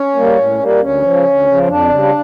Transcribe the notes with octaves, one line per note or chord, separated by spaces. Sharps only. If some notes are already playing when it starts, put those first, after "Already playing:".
Already playing: C#4
G3 A#3
A2
G3 A#3
D2 C#4
C#3 F3
D2
C#3 F3
F2 D4
C#3 G3